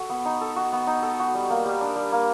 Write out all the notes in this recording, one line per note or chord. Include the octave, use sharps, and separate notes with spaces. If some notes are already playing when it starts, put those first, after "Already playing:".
Already playing: F#4 A4
B3
D#4
A4
F#4
B3
D#4
A4
F#4
G3
A#3
G3
D4
G3
A#3